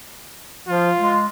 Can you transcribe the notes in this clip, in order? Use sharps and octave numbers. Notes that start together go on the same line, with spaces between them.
F3 F4
G#3